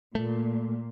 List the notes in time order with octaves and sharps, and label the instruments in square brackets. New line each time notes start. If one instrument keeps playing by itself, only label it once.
[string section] A#2 [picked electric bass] A3